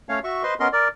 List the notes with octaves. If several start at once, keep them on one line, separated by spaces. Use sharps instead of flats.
A3 C#4 C#5 F5
F#4 E5 C#6
B4 C5 D#5 C6
B3 C#4 A#4 D#5 C6
A#4 D5